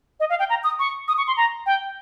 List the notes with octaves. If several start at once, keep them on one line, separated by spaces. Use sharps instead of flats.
D#5
F5
G5
A#5
D#6
C#6
D#6
C#6
C6
A#5
G5